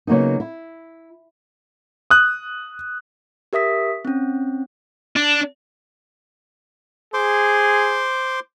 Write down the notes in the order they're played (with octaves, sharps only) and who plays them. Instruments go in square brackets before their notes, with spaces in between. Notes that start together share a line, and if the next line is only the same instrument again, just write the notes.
[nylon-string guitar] C#3 F#3 A#3 B3 D#4
E4
[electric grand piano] D#6 F#6
[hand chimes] G4 A#4 E5 D#6 B6
C4 C#4
[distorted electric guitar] D4
[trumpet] G#4 [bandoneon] C5 C6 D6